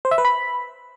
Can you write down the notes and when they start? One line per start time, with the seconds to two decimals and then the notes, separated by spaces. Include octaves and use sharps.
0.05 C5
0.11 E5
0.18 B4
0.25 B5